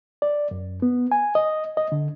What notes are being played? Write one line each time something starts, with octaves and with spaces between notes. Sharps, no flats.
D5
F#2
B3
G#5
D#5
D#5
D3